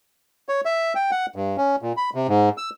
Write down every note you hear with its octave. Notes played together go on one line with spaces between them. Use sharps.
C#5
E5
G5
F#5
G2
C#4
A#2
B5
C3
G#2
E6